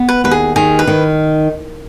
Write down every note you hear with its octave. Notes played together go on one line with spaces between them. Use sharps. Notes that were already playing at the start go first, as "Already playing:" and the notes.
Already playing: B3
B4
D#2 B4
G#4
D#3 G#4
B4
D#3